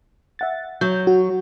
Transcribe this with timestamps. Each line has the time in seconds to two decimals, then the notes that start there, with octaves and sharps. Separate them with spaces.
0.39 E5 F#5 A6
0.81 F#3 G6
1.07 F#4